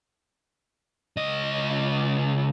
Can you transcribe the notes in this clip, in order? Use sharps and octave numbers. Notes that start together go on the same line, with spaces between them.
C#2 D#5